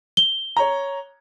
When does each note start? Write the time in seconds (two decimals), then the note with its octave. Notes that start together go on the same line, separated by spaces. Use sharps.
0.17 G7
0.57 C#5 A#5